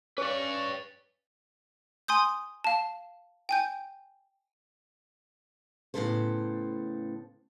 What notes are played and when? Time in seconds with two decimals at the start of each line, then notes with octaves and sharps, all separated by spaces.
0.18 C#4 B4 D5 C#6
2.08 G#5 C6 D#6 G6
2.64 F5 A5
3.49 G5 G#5 G6
5.94 A2 C#3 G#3 B3 A4 C5